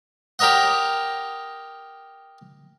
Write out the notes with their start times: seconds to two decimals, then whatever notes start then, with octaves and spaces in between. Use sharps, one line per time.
0.39 G4 A#4 C#5 D#5 F#5